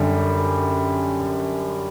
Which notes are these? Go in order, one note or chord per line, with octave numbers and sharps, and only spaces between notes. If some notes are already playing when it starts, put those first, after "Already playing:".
Already playing: F#2 D3 G3